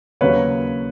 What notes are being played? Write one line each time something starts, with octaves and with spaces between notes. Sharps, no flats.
D#2 C#3 F#3 A#3 B4 C#5